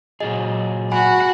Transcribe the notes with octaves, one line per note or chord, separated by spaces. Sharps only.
A#2 F#3 G#4 D#5
F#4 F#5 G#5 B5